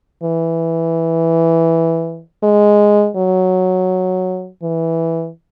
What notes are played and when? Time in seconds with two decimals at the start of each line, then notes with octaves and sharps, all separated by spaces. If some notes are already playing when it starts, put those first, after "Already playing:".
0.23 E3
2.43 G#3
3.16 F#3
4.63 E3